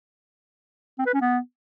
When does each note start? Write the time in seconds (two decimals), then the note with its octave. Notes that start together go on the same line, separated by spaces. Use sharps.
0.99 C4
1.06 B4
1.14 C#4
1.21 B3